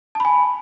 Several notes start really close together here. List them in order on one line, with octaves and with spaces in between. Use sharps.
A5 B5 G#5